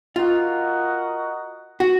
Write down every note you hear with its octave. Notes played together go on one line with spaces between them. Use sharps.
F4 F#4 A#4 D#5 F#5
F#4